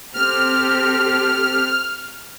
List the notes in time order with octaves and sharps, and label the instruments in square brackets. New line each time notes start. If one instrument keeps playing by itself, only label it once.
[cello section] C4 G4 A4 [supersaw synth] F6